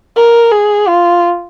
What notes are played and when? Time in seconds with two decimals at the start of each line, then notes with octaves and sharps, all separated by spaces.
0.16 A#4
0.51 G#4
0.88 F4